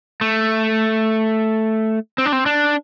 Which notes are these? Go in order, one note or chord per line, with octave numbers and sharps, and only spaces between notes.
A3
C4
D4
C4
D4